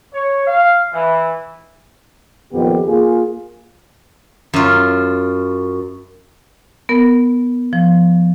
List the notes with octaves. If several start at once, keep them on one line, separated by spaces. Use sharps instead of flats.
C#5
F5
E3
F2 A#2 D#3 B3 G4
A#3 F4 G#4
F#2 F4
B3 A#4
F3